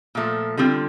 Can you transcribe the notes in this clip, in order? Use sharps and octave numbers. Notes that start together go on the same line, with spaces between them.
A#2 F3 A3
D3 G3 C4 F4